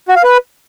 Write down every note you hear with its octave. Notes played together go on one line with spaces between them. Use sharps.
F#4
F5
B4